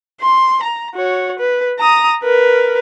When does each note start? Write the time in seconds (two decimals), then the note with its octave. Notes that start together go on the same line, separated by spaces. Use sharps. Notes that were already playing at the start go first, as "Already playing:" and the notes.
0.21 C6
0.63 A#5
0.95 F#4 C#5
1.39 B4
1.79 A#5 D#6
2.24 A#4 B4